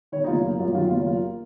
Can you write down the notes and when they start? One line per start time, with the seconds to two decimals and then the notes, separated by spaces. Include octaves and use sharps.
0.12 D#3 C#5
0.24 D#4
0.27 F#1 F4
0.43 A#3 D#4
0.59 F#2 F4
0.74 D#3 F4
0.91 F#1 F4
1.06 A#3 F4